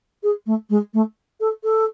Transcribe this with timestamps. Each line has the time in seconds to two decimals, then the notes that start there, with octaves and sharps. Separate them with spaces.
0.23 G#4
0.46 A3
0.70 G#3
0.93 A3
1.40 A4
1.63 A4